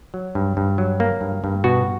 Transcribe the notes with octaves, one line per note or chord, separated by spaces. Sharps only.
F#3
G2
G2
F#3
A#3
G2
G2
B2 F#4